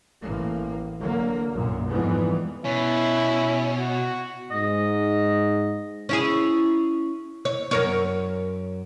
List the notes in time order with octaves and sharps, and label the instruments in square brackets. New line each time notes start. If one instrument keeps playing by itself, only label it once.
[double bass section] A1 A#3
D3 F#3 A#3
B1 F#2 A#2
F2 G#2 E3 G3 B3
[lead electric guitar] B2 [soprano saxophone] C#4 [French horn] E4
[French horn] F#4
[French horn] G#2 [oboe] D#5
[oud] C#4 E4 G#4
C#5
F#2 A#4 C#5